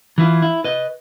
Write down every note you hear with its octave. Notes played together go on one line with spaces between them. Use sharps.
E3 E4 F4
E4
B4 D#5